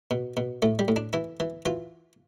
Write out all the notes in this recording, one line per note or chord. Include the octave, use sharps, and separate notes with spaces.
B2
B2
A2 A3
G3
A2
D4
E3 E4
E3
E3 F4